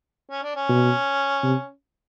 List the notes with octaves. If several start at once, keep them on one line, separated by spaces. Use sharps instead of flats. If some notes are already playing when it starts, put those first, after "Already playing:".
C#4
D4
C#4
B2
C3